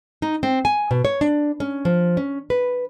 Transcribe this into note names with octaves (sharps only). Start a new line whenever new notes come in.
D#4
C4
G#5
B2
C#5
D4
C#4
F3
C#4
B4